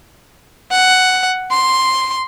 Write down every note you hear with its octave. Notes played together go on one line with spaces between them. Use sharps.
F#5
C6